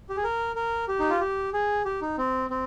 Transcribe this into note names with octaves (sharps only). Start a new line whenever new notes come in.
G4
G#4
A#4
A#4
G4
D#4
F4
G4
G#4
G4
D#4
C4
C4